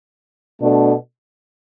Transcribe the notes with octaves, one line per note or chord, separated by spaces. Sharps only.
B2 A3 D4 A4